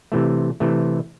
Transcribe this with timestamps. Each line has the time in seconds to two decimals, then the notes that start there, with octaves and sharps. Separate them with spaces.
0.12 C3 E3 A3
0.60 C3 E3 A3